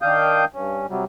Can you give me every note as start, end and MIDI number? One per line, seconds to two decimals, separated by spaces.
0.02 0.45 51
0.02 0.45 62
0.02 0.45 77
0.02 0.45 79
0.02 0.45 87
0.02 0.45 91
0.54 0.86 43
0.54 0.86 61
0.89 1.05 48
0.89 1.05 54
0.89 1.05 55